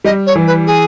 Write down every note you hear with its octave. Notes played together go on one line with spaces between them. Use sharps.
G3 D#5
C#5
E3
B4
G#4